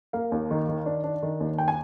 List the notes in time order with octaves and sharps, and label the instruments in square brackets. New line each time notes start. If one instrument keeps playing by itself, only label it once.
[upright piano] A#3 F5
D#2
D#3
D#3
D4
D4
D#3
D#2
G5
G#5